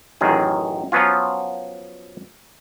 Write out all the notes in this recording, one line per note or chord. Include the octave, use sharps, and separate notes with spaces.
A1 F#2 D#3 F#3 G#4
F3 F#3 B3 C#4 F4